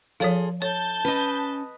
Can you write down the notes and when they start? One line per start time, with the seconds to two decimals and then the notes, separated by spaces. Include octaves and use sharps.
0.20 F3 F4 G#4 A4 C#5 F5
0.62 A4 C#5 A5 G6
1.05 C#4 B4 D#5